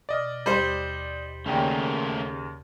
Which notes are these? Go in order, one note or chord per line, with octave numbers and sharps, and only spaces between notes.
B2 D5 D#5 F6
D#2 G3 C5
D#2 C#3 A3 C#4 A#4 D5 G5